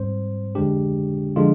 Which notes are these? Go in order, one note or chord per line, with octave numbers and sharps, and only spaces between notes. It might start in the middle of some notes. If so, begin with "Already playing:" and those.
Already playing: G#2 G3 C4 C5
F2 D3 G#3 D4 G4
D3 F3 G#3 D4 F4